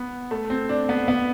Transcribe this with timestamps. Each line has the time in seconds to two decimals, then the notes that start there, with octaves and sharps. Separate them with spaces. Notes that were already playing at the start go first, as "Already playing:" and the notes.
Already playing: B3
0.31 A3
0.50 C4
0.69 D4
0.89 B3
1.08 B3